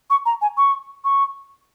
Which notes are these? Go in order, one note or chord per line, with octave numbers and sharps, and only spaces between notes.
C#6
A#5
G#5
C#6
C#6